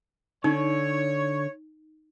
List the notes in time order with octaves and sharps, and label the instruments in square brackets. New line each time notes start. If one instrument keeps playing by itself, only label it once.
[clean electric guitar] D3 [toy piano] D#4 [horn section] C#5